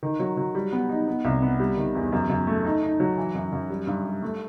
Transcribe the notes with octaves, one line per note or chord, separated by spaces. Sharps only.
D#3
F#3
F#3
G3
B3
D#4
B3
C2
B3
G3
D#3
E2
F#2
F#2
A3
D#4
D#4
F#3
E3
F#2
F#2
G3
G2
G3
A3